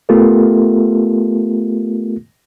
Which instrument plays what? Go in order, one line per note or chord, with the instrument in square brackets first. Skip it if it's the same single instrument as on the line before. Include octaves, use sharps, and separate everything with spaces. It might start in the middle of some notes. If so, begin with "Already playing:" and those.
[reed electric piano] A3 B3 F4 G4 A4 A#4